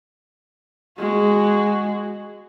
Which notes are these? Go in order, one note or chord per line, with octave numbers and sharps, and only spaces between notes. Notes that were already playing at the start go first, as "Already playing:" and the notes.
G#3 F#4